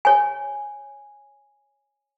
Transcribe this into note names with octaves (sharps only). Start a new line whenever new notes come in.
C#5 G#5